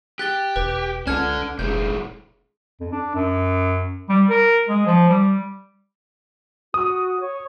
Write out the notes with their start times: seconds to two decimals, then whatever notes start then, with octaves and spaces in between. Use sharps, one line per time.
0.19 G4 F#6 A6 G7
0.56 E1 B4
1.07 C#2 C#4 D4 A4 G#5 F6 G#6
1.59 F1 A#2 G#3 G6
2.80 F2
2.92 D4
3.15 F#2
4.09 G3
4.29 A#4
4.69 G#3
4.86 F3
5.09 G3
6.74 F#4 D#6
7.20 C#5